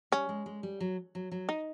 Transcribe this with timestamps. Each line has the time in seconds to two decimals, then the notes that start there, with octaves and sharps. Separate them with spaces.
0.12 G3 C#4
0.29 G#3
0.46 G#3
0.63 G3
0.80 F#3
1.15 F#3
1.32 F#3
1.49 D#4